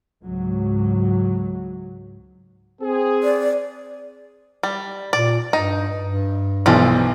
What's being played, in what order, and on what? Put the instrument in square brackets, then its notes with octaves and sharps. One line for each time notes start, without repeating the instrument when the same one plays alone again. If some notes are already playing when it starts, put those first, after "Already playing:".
[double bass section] C#2 G#2 F#3
[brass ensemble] C4 G#4
[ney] D5
[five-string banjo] G3
[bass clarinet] A#2 [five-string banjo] D5
[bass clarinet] G2 [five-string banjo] D#4
[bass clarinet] G2
[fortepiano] B1 E3 [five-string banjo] F3 G3 G#3